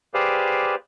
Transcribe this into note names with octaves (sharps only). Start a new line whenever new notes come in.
G4 G#4 B4 C5 D5 F5